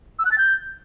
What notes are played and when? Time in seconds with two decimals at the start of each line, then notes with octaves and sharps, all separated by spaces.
0.19 E6
0.25 F#6
0.32 A6
0.38 G6